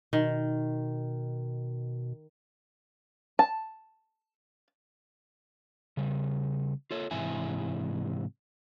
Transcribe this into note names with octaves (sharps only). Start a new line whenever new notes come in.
B2 D#3
A5
C#3 G3
F4 A4 C#5
G#2 C3 E3 E4 G#5